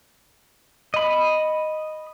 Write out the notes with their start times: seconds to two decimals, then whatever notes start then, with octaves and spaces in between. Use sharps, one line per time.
0.94 D#5 B5